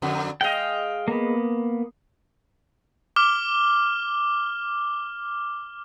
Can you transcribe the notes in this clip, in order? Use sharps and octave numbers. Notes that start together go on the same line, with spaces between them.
F2 D3 F#3
G#3 D#5 F5 G5
A#3 B3
D6 F6 G7